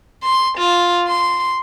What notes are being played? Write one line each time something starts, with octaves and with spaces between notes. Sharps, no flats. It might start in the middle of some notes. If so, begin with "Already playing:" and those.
C6
F4
C6